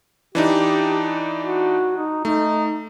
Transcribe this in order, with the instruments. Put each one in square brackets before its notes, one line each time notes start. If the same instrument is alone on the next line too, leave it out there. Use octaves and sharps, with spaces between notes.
[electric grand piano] E3 D4 D#4 [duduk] G4
[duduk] F#4
D#4
[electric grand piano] A3 [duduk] D#4